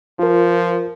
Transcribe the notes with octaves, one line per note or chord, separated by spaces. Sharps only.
F3 F4 A#4